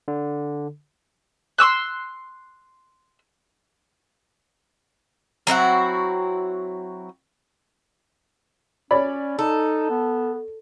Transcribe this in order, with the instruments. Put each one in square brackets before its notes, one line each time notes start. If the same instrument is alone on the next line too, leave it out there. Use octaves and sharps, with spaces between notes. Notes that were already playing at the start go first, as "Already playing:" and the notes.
[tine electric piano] D3
[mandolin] C6 C#6 E6 F#6
[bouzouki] F#3 C4 E4 F#4
[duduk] C#4 [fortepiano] C#5 D5 B5
[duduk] D#4 [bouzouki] A4
[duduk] B3